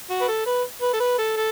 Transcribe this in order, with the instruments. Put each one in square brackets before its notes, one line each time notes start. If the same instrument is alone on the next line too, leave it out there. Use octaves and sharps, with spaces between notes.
[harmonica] F#4
B4
A4
B4
B4
A4
B4
A4
A4